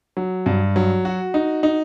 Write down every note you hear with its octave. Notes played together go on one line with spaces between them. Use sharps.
F#3
G2
F#3
F#4
D#4
D#4